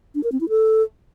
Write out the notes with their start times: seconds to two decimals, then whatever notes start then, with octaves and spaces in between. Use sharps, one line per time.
0.15 D4
0.24 A#4
0.32 C4
0.41 E4
0.49 A4